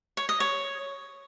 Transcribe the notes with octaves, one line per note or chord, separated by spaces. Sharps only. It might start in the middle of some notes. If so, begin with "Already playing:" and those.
C#5
D#5
C#5